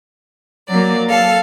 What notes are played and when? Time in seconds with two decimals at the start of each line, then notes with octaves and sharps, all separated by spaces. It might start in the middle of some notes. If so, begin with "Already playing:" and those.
0.69 F#3 A#3 D5
1.10 A4 F5